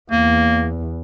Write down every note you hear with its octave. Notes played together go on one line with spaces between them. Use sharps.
E2 A#3